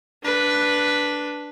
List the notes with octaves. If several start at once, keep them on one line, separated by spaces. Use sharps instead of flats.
D4 B4